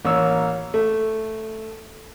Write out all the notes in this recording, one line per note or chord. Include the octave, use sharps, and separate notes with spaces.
A1 A#3 C#5 E6
A3